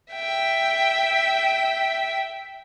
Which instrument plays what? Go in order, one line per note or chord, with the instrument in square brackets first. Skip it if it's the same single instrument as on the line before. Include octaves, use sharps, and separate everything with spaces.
[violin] E5 G5